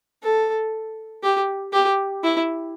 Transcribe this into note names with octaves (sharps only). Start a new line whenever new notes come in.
A4
G4
G4
E4